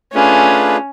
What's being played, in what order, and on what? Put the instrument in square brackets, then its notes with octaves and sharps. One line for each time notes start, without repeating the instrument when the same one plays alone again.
[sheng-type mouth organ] A3 D4 F4 G#4 B4 [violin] C#4